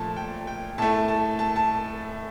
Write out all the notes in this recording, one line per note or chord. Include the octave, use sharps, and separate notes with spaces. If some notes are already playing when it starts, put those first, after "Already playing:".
Already playing: A#2 F3 A3 A5
G5
G5
A2 A3 A5
A5
A5
A5